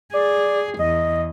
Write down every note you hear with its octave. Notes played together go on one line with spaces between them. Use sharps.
G#4 D5
E2 D#5